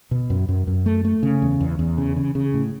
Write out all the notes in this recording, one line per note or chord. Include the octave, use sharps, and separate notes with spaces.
B2
F#2
F#2
F#2
A3
A3
C#3
E2
E2
E2
C#3
C#3
C#3
A2